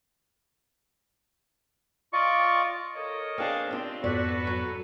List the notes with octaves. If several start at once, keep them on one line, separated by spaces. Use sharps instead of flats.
F4 D5 D#5 C#6
A4 A#4 C#5 D#5
C4 D4 G#4 F5
C4 D4 F4 G4
F2 G#2 B3 F#4 A4 B4 D5
F#3